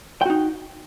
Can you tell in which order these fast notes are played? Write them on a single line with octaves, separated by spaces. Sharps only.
G5 F#4 D#4